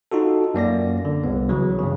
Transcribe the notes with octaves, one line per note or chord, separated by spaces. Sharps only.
D#4 F4 F#4 A4
F#2 A#3 D5 A#6
D3
C2 B3
C#3 E3 F#3
G2 C#3